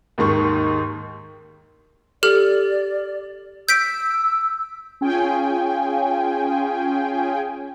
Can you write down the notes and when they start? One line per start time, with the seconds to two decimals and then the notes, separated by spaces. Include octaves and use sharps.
0.18 D#2 G#2 D#3 C#6
2.23 G4 A4 D5 F6
3.69 E6 G6 B6 D7
5.01 C#4 F4 G#4 G5 G#5